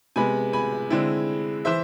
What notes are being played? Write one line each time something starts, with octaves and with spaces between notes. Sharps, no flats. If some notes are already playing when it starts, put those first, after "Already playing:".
C3 G#3 B3 G#5 B5
G#5 B5
D3 G#3 C4 E4
E3 C5 E5